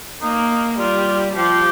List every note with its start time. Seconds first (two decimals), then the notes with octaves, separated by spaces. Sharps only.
0.22 A#3 D#4
0.79 G3 F4
1.36 F3 G4